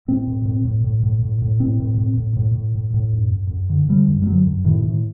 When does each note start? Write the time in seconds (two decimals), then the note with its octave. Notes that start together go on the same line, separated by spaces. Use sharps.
0.08 A2 C4
0.27 A2
0.46 A2
0.65 A2
0.84 A2
1.03 A2
1.23 A2
1.42 A2
1.60 A2 C4
1.80 A2
1.98 A2
2.17 A2
2.37 A2
2.55 A2
2.75 A2
2.94 A2
3.13 F#2
3.32 F#2
3.51 F#2
3.69 D3
3.89 D3 G3
4.08 F#2
4.22 G3
4.26 D3 F#3
4.46 F#2
4.65 A2 D#3
4.85 A2